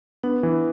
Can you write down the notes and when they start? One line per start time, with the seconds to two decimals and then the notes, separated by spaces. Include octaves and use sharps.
0.23 B3 D4
0.43 E3